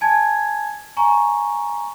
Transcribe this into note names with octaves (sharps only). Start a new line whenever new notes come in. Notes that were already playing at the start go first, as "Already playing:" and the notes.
G#5 A5 G#6
G#5 A#5 C#6